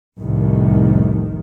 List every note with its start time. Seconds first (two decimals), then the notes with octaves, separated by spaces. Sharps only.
0.20 F1 C2 A2 D#3